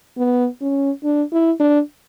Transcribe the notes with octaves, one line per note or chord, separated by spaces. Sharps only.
B3
C#4
D4
E4
D4